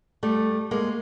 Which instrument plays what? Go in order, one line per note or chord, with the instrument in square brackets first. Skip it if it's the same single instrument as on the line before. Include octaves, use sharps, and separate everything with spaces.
[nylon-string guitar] G3 A3
G#3 A#3